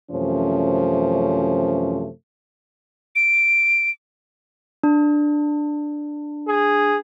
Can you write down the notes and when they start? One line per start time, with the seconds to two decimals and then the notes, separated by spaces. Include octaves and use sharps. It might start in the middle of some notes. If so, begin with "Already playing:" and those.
0.11 F#2 C3 E3 F3 A3 C#4
3.16 D7
4.83 D4
6.48 G#4